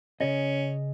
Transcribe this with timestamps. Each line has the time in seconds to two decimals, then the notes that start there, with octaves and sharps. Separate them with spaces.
0.21 C#3 C#4 G#4 D#5